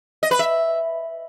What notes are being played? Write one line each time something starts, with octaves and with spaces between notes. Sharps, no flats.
D#5
B4
E5